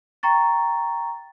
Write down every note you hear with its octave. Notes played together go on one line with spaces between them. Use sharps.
G5 A#5 C#6 A6